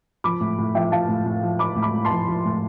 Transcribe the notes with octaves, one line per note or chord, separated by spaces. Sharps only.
F3 B5 D6
A2
A2
F3 E5 G5
F3 F5 A5
A2
A2
F3
F3 B5 D6
A2
B5 D6
A2
A5 C6
F3
F3
A2